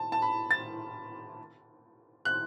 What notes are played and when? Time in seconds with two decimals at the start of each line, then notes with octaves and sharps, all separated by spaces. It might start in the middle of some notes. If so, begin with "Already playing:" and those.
Already playing: A5
0.12 A5
0.22 B5
0.51 A6
2.25 F#6